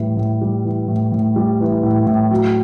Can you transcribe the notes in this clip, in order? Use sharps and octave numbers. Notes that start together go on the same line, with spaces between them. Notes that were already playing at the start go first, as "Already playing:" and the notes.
Already playing: A2 E3 G3
A2
G3
E3
A2
A2
G3
E3
A2
A2
F#3